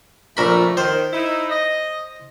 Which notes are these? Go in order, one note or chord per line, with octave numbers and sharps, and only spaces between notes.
A#1 A3 A#4 B5
D#3 C5
D#4 E4
D#5